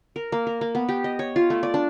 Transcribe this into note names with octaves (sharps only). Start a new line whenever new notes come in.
A#4
A#3
A#4
A#3
B3
G4
D#5
C#5
F4
A3
D5
D4